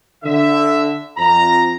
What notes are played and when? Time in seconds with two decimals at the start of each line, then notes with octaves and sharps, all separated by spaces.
0.24 D3 E5
1.18 F2 A#5